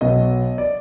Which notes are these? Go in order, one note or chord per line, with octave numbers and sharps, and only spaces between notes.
B1 B2 F#3 D#5
D5